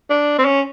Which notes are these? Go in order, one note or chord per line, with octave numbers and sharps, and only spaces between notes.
D4
C4
C#4